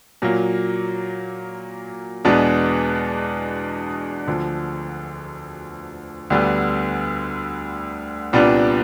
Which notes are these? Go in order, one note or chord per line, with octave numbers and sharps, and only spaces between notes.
A#2 F#3 A#3
E2 B2 G#3 B3 D4
D2 D3 F3
D2 D3 G3 B3
C2 A#2 G3 B3 D4